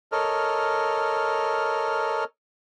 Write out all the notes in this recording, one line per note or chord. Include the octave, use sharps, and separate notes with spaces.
A4 A#4 C#5 D#5 F6